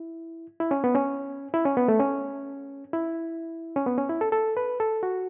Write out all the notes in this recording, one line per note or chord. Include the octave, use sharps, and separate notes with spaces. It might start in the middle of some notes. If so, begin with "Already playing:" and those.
Already playing: E4
E4
C#4
B3
C#4
E4
C#4
B3
A3
C#4
E4
C#4
B3
C#4
E4
A4
A4
B4
A4
F#4